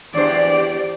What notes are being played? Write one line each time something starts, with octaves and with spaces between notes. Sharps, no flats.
E2 D4 G4 C5 D5